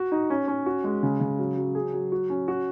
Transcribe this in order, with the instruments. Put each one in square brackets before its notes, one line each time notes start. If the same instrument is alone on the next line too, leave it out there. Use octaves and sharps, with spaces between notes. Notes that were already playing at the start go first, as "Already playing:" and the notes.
Already playing: [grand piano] F#4
D#4
C#4
C#4
F#4
G#3
C#3
C#3
F#3
F#3
G#4
F#3
F#4
C#4
F#4